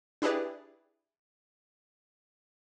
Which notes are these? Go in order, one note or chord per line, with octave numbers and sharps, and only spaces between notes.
D4 E4 G4 G#4 B4 D5